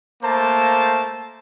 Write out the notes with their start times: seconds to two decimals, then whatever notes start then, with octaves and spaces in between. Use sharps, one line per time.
0.24 A3 A#3 C5 A5